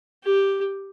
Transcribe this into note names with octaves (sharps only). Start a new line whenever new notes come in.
G4